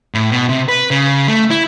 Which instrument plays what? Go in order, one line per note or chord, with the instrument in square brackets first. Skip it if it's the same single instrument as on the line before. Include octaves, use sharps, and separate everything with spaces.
[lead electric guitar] A2
B2
C3
B4
C#3
A3
E4